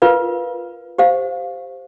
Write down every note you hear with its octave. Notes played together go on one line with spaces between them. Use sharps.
F4 A#4 B4 F5
G4 C5 F5